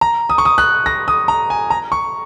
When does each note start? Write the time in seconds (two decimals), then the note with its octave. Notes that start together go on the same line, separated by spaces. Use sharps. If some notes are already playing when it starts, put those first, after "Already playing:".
0.01 A#5
0.29 D#6
0.38 C#6
0.45 D#6
0.58 F#6
0.86 A#6
1.08 D#6
1.28 A#5
1.50 G#5
1.70 A#5
1.92 C#6